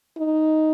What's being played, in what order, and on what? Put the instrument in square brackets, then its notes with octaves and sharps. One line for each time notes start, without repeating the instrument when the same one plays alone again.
[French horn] D#4